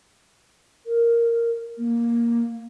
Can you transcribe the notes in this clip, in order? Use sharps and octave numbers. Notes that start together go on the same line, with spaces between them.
A#4
A#3